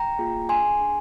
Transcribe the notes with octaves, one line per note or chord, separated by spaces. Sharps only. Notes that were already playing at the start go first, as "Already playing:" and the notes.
Already playing: G5 A#5
A#3 F4 G#4
D4 G#4 G#5 C6
D4 G#4